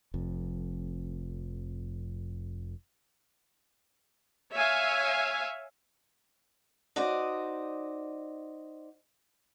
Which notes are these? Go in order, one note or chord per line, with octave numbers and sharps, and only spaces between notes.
F1 F2
C#5 E5 F5 G#5
D#4 F#4 C5 D5 D#5